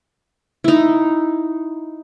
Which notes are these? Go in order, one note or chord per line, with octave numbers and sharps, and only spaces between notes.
D#4 E4